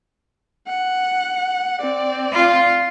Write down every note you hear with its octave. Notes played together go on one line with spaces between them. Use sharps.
F#5
C4 D5
F4